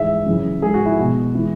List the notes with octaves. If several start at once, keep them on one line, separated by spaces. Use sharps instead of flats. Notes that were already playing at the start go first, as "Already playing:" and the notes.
Already playing: G#2 E3 G#3 E5
F#2 C#3 E3
G#2 G#3 G#4
F#4
E4
B2 G#3 F#4
E3 G#3